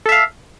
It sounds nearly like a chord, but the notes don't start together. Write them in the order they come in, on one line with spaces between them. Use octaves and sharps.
A4 E5 F5